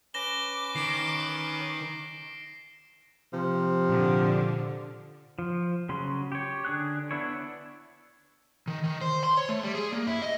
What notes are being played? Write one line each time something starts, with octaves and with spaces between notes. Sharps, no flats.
C#4 B4 D6 A#6 E7 G7
D#3 C7 D7
C3 F3
A#2 D3
F3
C#3 F#3 C#4 C6
G4 C#5
D3 D4 G#4 F#6
B3 D4 E4 C#5
D#3
D#3
C5
C6
C#5
A3
G3
G#4
A#3
E4
D#5